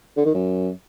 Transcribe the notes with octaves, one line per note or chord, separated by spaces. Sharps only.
D3
D#3
F#2